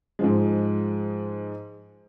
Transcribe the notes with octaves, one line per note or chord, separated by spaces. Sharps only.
G#2 F3 G#3